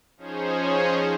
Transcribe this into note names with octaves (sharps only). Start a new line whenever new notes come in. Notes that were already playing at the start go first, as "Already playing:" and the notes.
F3 C#4 D#4 G#4 C5 C#5